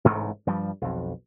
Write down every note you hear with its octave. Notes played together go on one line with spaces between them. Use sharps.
A1 G#2 C3 A3
G2 F3 G3
B1 F2